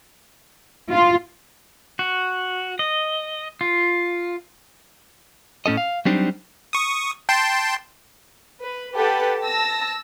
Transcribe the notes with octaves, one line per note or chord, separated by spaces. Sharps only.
F4
F#4
D#5
F4
A2 C#4 A4 D#5
F5
F#3 G3 C4 D4 D#4
C#6 D#6
G5 A5 C6
B4
G4 A4 B4 F#5 A5
A5 E6 A#6